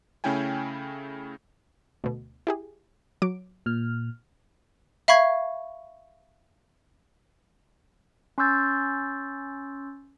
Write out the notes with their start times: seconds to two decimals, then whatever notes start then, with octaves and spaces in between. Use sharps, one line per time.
0.24 C#3 A3 C#4 E4 G5 G#5
2.04 D2 B2
2.47 E4 G4 G#4
3.22 F#3 D6 D7
3.66 A#2 F6
5.08 E5 F5 B5 C#6 G#6
8.38 C#4 C6 C#6 E6 G6 A6